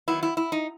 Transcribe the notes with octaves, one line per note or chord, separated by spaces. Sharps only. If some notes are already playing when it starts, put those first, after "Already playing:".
D#3 F#3 B3 E4
E4
E4
D#4